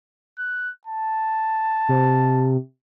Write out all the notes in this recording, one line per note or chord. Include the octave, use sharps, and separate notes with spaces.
F#6
A5
C3